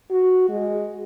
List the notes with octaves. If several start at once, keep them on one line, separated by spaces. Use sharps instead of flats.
F#4
G#3